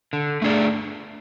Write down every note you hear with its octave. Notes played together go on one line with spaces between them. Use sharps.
D3
A3 D4 G#4 D5